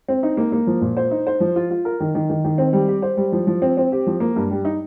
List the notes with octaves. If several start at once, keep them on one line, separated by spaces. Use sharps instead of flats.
C4
D#4
A#3
A#3
F3
A#2
C5
D#4
C5
F3
F4
F4
A#4
D#3
D#3
D#3
D#3
C4
G3
G4
C5
G3
F3
F3
C4
C4
G4
F3
A#3
G2
G3
D#4